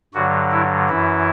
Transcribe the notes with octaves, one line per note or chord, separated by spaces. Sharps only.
G2 D3 F#3 F#4
E4
F#2 E3 E4